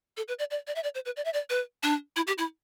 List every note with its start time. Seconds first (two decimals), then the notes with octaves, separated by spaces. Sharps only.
0.17 A4
0.28 B4
0.39 D5
0.51 D5
0.67 D5
0.75 E5
0.83 D5
0.95 C5
1.06 B4
1.17 D5
1.25 E5
1.33 D5
1.50 B4
1.83 D4
2.16 E4
2.27 G4
2.38 E4